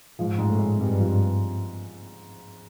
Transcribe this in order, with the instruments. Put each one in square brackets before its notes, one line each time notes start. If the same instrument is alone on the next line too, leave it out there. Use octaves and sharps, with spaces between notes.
[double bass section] G#2 [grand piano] F3
[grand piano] G#2
[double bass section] A2
[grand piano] G#3
[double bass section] G2 [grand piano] C4
[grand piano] F3